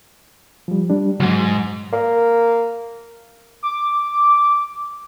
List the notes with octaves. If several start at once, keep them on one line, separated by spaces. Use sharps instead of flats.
F3 G3
G3 D4
D2 G#2 F#3
A#3
D6